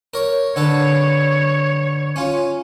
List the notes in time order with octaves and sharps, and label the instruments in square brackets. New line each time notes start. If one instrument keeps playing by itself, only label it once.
[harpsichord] A#4 C#5
[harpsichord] D3 A4 B4 [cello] C#5
[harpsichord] C#4 F4